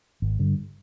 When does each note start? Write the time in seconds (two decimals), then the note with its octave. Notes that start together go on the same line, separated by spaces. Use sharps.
0.22 G#1
0.39 G2 D3